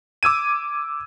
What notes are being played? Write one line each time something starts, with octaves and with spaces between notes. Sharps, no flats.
D6 E6 G#6 D#7